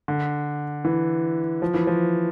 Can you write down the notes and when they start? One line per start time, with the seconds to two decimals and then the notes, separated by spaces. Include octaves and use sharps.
0.08 D3
0.85 E3
1.62 F3
1.74 E3
1.87 F3